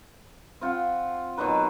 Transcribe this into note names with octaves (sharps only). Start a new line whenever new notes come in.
C4 F4 F#5
B2 D#3 F#3 B4